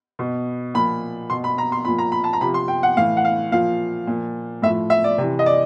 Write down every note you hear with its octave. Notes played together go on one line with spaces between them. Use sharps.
B2
A#2 F3 B5
B2 C6
B5
A#5
C6
A#2 F3 B5
A#5
B5
A5
A#5
C3 F3 B5
C6
G5
F#5
A2 E3 F5
F#5
F5
A#2 F3 F5
A#2 F3
A2 E5
F3
E5
D5
C3
E3
D#5
D5